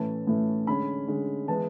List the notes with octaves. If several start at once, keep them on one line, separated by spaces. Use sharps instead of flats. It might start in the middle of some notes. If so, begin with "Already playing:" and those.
Already playing: A2 E3 A3 C#4 A5
A2 E3 A3 C#4
D3 G#3 C#4 B5
D3 G#3 C#4
E3 G#3 B3 A5